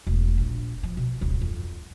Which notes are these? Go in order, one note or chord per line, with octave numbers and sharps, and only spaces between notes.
E1 A3
A#1
F3
B2
D1 G1
F2